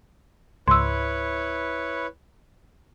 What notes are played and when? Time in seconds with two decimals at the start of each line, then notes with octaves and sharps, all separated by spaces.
0.68 C#2 G#2 E4 B4 C#5 C6 E6